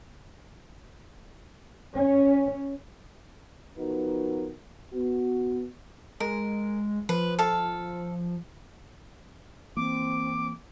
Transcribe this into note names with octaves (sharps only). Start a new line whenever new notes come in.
C#4
F3 B3 D#4 F#4 A#4 B4
B3 F#4
G#3 A#4
F3 B4
A4 F5
E3 A#3 C4 D6